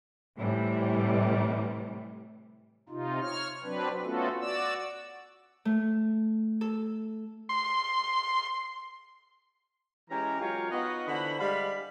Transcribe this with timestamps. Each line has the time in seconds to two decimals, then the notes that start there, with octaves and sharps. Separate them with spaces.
0.37 A2 C3 E3 G3
2.89 C3 D#4 F4
3.21 C#5 F6
3.63 F#3 C4 D4 B4
4.04 A3 B3 C#4 F4 F#4 A4
4.40 F#4 D5 E6
5.65 A3
6.61 A4
7.49 C6
10.10 E3 G#3 C#4 G4 A#5
10.40 F#3 G#3 F4 G4 A#4 C#5
10.70 B3 D#4 F4 F#4 B4 D#5
11.08 D3 E3 C5 F#5 B5
11.38 G3 G#3 F5 B5